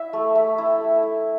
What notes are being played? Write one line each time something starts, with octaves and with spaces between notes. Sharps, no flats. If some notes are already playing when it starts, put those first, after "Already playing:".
Already playing: E4 E5
A3
A3 E5
E4
G5
A3
E5
E4